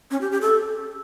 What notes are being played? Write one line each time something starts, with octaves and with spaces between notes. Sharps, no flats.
C#4
G4
G4
A4